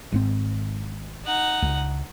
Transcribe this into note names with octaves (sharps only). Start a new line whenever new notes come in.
G#1 G#2 C4
D#4 F#5
C#2